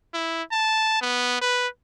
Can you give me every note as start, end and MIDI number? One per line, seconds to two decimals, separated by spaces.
0.14 0.43 64
0.52 1.01 81
1.02 1.41 59
1.41 1.68 71